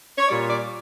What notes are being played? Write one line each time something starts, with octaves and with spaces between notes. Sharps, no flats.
C#5
A#2 G3 D5
D5